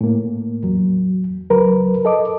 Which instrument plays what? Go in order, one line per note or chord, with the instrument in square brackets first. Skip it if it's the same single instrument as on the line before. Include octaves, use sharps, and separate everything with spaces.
[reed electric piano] A2 A#3
E2 F#3
C#2 F#3 A#4 B4
A4 D#5 D6